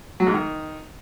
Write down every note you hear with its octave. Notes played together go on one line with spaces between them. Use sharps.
F#3
G#2
D#3